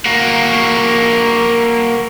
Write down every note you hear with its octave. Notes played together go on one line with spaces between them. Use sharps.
A#3 F#4